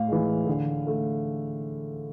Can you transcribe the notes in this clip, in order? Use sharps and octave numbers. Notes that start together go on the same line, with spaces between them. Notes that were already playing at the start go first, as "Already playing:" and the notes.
Already playing: A2 F5
E3 G#3
D3
A3